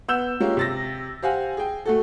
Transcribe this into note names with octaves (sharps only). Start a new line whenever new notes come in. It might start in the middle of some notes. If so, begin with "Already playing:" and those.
B3 E6 G6 E7
G#3 A#3 C#4 F4 G4
C3 A6 A#6
G4 C5 F5 F#5 G#5
G#4 G5
A3 F#4 A4